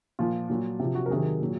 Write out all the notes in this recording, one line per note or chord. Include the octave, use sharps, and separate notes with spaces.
A#2 F3 F4
A#2 F#3
C3 F3
F#4
A#4
C3 D#3 F#3 G#4
A#2 F#3